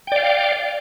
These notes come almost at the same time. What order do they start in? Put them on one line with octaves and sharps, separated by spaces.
G5 D5 F5